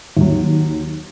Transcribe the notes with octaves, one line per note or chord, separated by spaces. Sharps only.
D#2 F#3